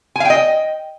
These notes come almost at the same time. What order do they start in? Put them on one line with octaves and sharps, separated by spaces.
G#5 F5 G5 D#5